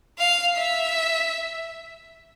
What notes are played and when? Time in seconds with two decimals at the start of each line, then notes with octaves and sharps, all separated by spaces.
0.19 F5
0.57 E5